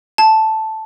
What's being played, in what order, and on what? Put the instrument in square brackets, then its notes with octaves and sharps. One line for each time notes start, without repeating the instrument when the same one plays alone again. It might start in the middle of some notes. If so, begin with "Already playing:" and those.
[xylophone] A5